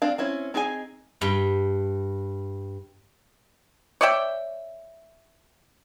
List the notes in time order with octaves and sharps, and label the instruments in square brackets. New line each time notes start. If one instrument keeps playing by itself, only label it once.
[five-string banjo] C4 D4 F5
C4 C#4 E4
C4 D#4 G#4 A#4 G#5
[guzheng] G2 G5
[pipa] C#5 D5 E5 G5